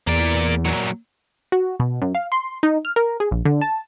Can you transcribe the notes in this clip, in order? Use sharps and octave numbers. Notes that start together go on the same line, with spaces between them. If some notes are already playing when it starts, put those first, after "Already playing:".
E2 A#3 D5
A#2 F#3
F#4
B2
F#2
F5
C6
D#4
F6
A#4
G#4
A#1
D3
A5